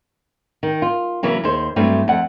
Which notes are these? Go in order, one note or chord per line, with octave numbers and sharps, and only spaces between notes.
D#3
F4
C#3 E3 F#3 A#3
D#2 G#4 C5
G2 F#3 A3 C4
F2 F#5